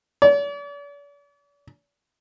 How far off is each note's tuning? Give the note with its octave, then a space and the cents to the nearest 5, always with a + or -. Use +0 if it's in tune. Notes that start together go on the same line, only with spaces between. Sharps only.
D5 -45